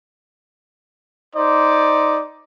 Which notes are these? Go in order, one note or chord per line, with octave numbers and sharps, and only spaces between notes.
D#4 C5 D5